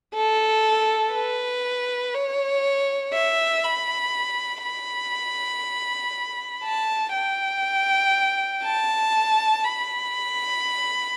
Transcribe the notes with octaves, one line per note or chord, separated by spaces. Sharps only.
A4
B4
C#5
E5
B5
B5
A5
G5
A5
B5